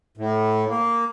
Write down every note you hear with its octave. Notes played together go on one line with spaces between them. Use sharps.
A2
A#3